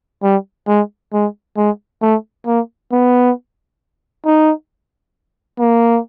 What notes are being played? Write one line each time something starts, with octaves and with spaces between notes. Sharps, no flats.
G3
G#3
G#3
G#3
A3
A#3
B3
D#4
A#3